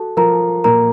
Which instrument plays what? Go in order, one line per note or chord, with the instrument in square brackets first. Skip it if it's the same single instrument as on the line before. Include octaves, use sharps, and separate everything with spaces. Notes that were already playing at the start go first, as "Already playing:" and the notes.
Already playing: [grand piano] F#4 [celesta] A4 A5
[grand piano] F3 [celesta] A#4 A#5
[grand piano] A#2 [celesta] A#4 A#5